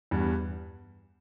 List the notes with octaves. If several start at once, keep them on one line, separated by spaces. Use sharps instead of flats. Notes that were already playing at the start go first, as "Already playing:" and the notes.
E2 G2